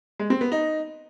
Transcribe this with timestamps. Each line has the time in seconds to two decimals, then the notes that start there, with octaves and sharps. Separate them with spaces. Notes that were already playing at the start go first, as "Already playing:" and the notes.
0.19 G#3
0.30 C4
0.41 B3
0.52 D#4